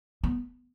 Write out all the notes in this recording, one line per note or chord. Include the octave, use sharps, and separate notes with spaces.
B3